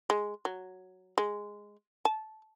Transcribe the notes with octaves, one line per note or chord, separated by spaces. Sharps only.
G#3
F#3
G#3
A5